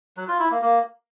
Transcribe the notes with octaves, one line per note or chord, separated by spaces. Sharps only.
F#3
F4
E4
A#3
A#3